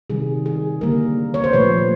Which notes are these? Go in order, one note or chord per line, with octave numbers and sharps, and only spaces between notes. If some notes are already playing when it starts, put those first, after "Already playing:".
C3 D#3 G3 G#4
G#4
D3 G3 A#3 A#4
C#5
C5
A#2 F3 A3 B4